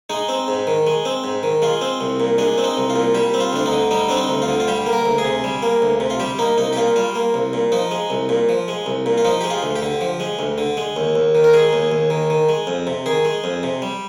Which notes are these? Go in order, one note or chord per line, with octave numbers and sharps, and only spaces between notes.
G#3 D#4
C4
G#2
D#3
G#3
C4
G#2
D#3
G#3 F4
C4
C2
A#2
G#3 D4
C4
D#4
C2
F4
A#2
G3 G4
C4
F4
D2 D4
D#4
D3
G3 D#4
C4 D4
D#4
D2
F4
D3
F4
G3 G4
A#3
A#4
D2
G#4
C3
G3
A#3
D2
C3
F4
G3 G4
A#3 D#4
C2 D#4
G4
A#2 F4
G3 F4
A#3
C2
A#2
F3 D#4
G#3
C2
A#2
F3
G#3
C2
A#2
F4
F3 D#4
G#3 G4
F4
D2
G4
D3
F3
G#3
D2
D3
G#3
D#2
D#2
D#3
A#4
G#3 G#4
D#2
D#2
D#3
D#3
G#3
F2
C3
D#3 G#4
G#3
F2
C3
G3